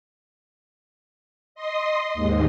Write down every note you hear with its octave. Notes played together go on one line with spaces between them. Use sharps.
D#5 C6 D#6
D#2 G#2